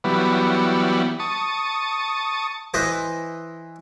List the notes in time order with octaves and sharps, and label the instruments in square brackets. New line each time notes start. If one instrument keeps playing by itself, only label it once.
[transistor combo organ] E3 F#3 G3 B3
A5 C#6 D#6
[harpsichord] E3 B4 C5 D#5